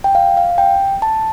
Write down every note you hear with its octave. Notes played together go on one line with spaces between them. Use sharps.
G5
F5
F5
G5
A5